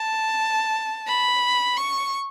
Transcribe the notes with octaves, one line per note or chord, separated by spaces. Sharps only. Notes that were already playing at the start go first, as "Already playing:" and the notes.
Already playing: A5
B5
C#6